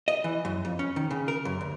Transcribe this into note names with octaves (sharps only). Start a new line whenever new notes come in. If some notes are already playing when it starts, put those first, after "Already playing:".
D#5
E3
F#2
F2
C#4
D#3
C#3
A#4
F#2
D2